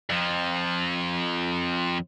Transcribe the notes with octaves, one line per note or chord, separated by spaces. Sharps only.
F2 F3